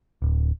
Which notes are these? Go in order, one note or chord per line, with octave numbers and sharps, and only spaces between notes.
D1